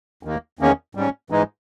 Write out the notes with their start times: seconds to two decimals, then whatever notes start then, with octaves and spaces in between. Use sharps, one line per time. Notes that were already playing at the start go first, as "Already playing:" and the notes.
0.23 D#2 D#3 A#3
0.59 E2 D#3 A#3 C#4
0.95 G#2 G3 C#4
1.30 G#2 E3 G#3 D#4